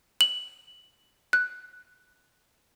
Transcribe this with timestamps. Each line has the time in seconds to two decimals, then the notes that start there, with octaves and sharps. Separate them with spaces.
0.21 F#7
1.33 F#6